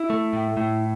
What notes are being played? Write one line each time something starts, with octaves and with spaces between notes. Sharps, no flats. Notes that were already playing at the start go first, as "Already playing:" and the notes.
Already playing: E4
A3
A2
A2